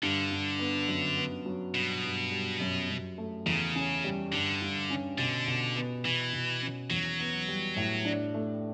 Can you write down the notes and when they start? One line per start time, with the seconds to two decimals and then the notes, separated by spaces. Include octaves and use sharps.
0.03 G2 D3
0.31 G2
0.59 B3
0.88 F#2
1.17 B3
1.46 F#3
1.74 G2 B2
2.04 G2
2.32 G3
2.61 F#2
2.90 F#2
3.18 A3
3.46 E2 C#3
3.75 C#4
4.04 G3
4.32 G2 D3
4.62 G2
4.90 C#4
5.18 B2 D3
5.47 B2
5.76 B3
6.05 B2 E3
6.33 B2
6.62 C#4
6.90 E2 F#3
7.20 B3
7.48 G3
7.76 A2
8.05 D4
8.34 A3